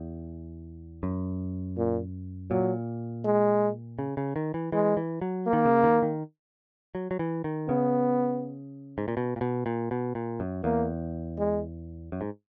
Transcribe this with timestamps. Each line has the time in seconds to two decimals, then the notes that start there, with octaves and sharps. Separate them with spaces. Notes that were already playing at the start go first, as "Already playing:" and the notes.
Already playing: E2
1.03 F#2
1.77 A#2
2.50 A#2 F#3
3.24 G#3
3.99 C#3
4.17 C#3
4.36 D#3
4.54 E3
4.72 E3 G#3
4.97 E3
5.21 F#3
5.47 A#3
5.53 D#3
5.65 C#3
5.84 D#3
6.02 D#3
6.95 F#3
7.11 F#3
7.19 E3
7.44 D#3
7.69 C#3 B3
8.98 G#2
9.08 A#2
9.17 B2
9.36 A#2
9.41 B2
9.66 A#2
9.91 B2
10.15 A#2
10.40 F#2
10.64 E2 A#3
11.39 G#3
12.12 F#2
12.21 G#2